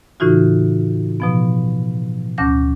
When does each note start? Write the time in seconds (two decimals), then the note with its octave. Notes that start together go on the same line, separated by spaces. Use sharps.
0.20 A2 C#3 E3 D#4 F4 F#4
1.20 B2 F3 B3
2.38 D2 C#4 D6 G6 A#6